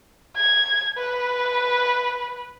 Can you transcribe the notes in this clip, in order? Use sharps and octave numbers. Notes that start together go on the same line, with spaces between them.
G#6
B4